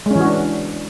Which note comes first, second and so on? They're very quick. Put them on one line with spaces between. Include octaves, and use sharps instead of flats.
G#3 C#4 E3 F#4 D4